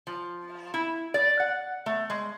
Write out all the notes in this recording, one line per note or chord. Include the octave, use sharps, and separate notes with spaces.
F3
E4
D5
F#5
A3
G#3